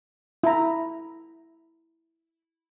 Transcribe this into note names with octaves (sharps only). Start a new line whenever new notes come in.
E4 A#5